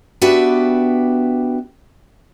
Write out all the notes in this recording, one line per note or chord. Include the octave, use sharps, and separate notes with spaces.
B3 D4 F#4 G4 B4 E5